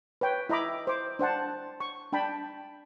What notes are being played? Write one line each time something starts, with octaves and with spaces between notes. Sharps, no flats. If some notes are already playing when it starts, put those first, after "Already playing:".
B4 C#5 G5
E4 D#5 A#5 B5 D6
C5 D6
D4 C5 F#5 A5
C#6
D4 G5 A5 B5